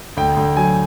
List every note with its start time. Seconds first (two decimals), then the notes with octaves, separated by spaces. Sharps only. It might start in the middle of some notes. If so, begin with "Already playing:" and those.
0.17 D2 G5
0.37 D2
0.57 F#3 G#5